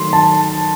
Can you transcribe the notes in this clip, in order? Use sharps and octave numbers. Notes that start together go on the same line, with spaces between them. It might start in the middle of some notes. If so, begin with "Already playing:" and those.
Already playing: D#3 F#3 A3 C6
A5